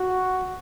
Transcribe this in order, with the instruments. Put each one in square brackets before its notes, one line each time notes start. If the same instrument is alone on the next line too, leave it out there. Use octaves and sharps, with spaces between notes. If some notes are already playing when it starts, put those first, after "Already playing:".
Already playing: [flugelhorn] F#4